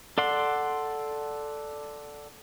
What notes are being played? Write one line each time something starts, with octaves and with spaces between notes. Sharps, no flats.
A4 D5 F#5 C6